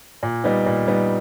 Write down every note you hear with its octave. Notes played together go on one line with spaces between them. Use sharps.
A#2
G3 B3 D#4
A#2
G3 B3 D#4